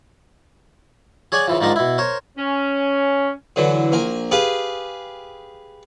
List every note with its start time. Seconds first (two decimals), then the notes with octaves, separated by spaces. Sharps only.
1.32 G#4 C#5 D5 F#5 G#5
1.48 C#3 E3 F3
1.61 G#2 D#3 F3 D4 D#4 A#4
1.76 B2 E4
1.98 A#4 C5 C#5
2.38 C#4
3.56 D3 E3 F#3
3.92 A#1 A#4 G#5
4.31 G4 G#4 B4 F5